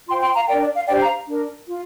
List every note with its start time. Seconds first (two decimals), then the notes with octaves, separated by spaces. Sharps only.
0.09 F4 C5 G5 C6
0.22 G5 C6
0.35 F5 A#5
0.48 A#4 D5 G5
0.53 D4
0.61 D5
0.74 F5
0.88 D4 G4 C5 D5 G5
1.01 F5 A#5
1.28 D4 A#4
1.67 F4